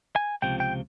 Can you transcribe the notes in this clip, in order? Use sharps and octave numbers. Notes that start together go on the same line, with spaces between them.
G#5
C#2 C3 F3 G5
G5